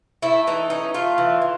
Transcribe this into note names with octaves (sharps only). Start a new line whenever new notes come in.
A3 E4
E3 D#4
C#4 D#4
A3 F4
E3
E3